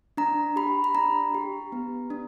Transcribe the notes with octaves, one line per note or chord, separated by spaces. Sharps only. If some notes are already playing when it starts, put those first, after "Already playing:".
D4 A#5
G4 B5
B5
D4 A#5
G4
B3
D4